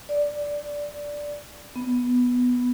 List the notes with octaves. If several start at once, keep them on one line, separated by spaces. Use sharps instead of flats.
D5
B3